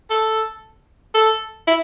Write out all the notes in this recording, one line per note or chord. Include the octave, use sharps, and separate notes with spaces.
A4
A4
E4